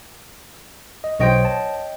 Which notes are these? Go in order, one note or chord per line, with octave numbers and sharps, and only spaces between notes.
D#5
B1 C5 C#5 D#5 G5
A5